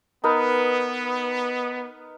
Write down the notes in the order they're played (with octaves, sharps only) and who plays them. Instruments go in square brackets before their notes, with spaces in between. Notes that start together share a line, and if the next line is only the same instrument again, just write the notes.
[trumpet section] B3 [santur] D#4 A#4 B4